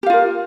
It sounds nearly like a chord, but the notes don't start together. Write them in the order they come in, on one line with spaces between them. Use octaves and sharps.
G4 F5 F4 A#4